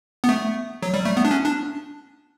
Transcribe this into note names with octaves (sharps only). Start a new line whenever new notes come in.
B3
A3
F#3
G3
A3
B3
D4
C#4
D4